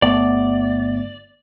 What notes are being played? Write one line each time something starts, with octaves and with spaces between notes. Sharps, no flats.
G1 A3 B3 D5